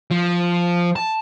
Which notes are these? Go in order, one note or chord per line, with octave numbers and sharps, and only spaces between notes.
F3
A5